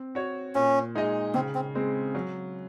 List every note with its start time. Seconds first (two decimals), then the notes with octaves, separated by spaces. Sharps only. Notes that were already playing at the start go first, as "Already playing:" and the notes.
Already playing: C4
0.15 F#4 C#5
0.55 A#2 C#4
0.95 G#3 D#4 G#4 D#5
1.34 C#3 C4
1.55 C4
1.75 G#3 C4
2.15 F#3